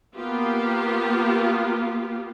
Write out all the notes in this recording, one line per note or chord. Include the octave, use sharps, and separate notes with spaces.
A#3 B3 F4 G4